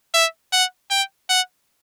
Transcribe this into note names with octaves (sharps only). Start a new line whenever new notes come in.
E5
F#5
G5
F#5